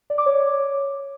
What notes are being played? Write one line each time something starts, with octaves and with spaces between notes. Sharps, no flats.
D5
D6
C#5